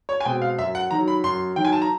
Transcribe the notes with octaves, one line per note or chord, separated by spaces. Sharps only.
C#5
G#5
B2 G#3 C4 G5
F5
F#2 E5
F#5
D#3 F#3 A#5
B5
F#2 C6
D#3 F#3 G5
G#5
A5
A#5